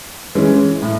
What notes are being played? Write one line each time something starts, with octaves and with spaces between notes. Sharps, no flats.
E3 G#3 C#4
A2